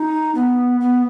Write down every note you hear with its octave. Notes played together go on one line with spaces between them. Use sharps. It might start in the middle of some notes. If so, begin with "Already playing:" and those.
Already playing: D#4
B3
B3